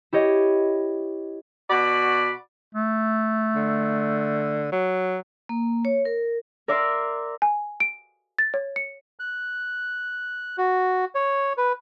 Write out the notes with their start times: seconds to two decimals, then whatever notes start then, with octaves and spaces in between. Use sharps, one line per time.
0.13 E4 G4 C#5 D#5
1.70 B2 F#4 D5 B5
2.75 A3
3.56 D3
4.72 F#3
5.49 A#3
5.85 C#5
6.05 A#4
6.68 A#4 D5 E5 C6
7.42 G#5
7.80 D7
8.39 A6
8.54 C#5
8.76 C#7
9.20 F#6
10.58 F#4
11.15 C#5
11.58 B4